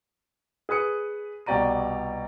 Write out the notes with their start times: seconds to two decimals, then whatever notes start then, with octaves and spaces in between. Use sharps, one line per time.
0.69 G#4 B4 D#6 C#7
1.46 C2 B2 G4 D5 A#5 D#7